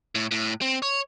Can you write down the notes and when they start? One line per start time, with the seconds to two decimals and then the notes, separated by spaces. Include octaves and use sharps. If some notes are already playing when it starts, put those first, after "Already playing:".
0.15 A2
0.31 A2
0.62 C4
0.82 C#5